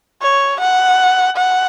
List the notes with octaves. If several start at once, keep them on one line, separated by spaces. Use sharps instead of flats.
C#5
F#5
F#5